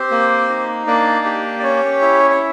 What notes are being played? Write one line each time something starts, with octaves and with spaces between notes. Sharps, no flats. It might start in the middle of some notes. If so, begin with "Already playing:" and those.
Already playing: C4 G4 C5
A#3
D#4
A#3 D4 D5
G4
D5
C#4 C#5
E4
C#5